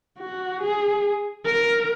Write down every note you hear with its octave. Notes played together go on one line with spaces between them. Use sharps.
F#4
G#4
A#4